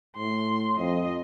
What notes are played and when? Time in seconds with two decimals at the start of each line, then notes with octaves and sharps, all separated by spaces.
0.17 A2 C6
0.77 F2 D#5